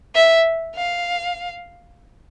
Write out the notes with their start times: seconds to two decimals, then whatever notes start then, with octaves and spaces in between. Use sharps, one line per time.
0.15 E5
0.76 F5